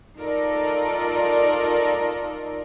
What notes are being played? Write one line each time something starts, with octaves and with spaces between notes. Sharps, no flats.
D#4 F4 A4 A#4 D5